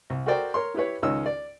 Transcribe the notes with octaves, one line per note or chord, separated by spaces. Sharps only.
C2
F#4 A4 A#4 C5 D5 G5
A#4 C#5 C6
E4 G4 B4 C#5
C#2 D#3 C#4 C#5 D#5 E6
D5